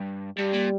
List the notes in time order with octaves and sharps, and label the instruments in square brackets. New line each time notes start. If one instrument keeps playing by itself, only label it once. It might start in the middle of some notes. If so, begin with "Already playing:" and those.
Already playing: [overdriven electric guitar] G2
[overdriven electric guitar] G2 [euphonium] G3
[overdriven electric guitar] A#2